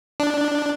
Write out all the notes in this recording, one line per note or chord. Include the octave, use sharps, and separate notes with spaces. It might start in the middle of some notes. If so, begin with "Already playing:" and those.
D4